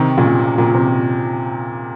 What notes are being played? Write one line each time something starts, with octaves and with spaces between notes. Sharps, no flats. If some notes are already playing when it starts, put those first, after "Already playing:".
Already playing: C3 D#3
A#2 C#3
A#2
C3